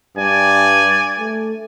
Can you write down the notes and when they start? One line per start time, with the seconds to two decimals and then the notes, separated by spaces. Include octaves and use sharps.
0.17 G2 D5 G#5
1.19 A3